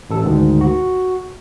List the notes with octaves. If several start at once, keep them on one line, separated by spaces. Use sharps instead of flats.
A1 A4
D2 G#2 D#3
F#4